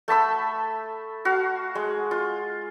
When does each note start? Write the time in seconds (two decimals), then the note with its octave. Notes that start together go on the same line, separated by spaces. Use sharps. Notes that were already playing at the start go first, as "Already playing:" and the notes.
0.08 A3 A5 B5 E6
1.25 F#4 F5
1.75 G#3
2.11 F4